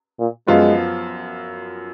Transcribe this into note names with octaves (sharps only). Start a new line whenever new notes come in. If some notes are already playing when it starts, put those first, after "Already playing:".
A#2
F#2 F3 G#3 B3 F4